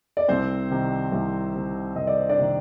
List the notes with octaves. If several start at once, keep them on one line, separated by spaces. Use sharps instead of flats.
D5
C2 C4 C5
C3 D#3
C2
C3 D#3
C2 D#5
D5
C5
D4 D5
C3 D#3